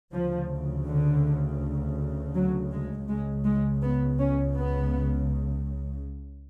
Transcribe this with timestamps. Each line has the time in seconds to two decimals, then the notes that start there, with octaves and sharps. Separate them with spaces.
0.12 D2 C#3 F3
0.87 D3
2.35 F#3
2.72 G#3
3.08 C#2 C#3 G#3
3.45 G#3
3.82 B3
4.19 C#4
4.56 B3